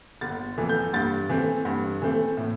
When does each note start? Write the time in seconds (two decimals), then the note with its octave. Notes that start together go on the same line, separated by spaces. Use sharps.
0.21 G1 A6
0.57 F2 E3 A3
0.69 G6
0.93 G2 A6
1.29 E3 A3 C4
1.65 G2
2.02 E3 A3 C4
2.37 A2